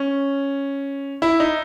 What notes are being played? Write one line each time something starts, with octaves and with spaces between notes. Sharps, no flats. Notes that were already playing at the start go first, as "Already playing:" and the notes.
Already playing: C#4
E4
D#4